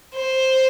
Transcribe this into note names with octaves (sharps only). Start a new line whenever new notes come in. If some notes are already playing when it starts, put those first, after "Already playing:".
C5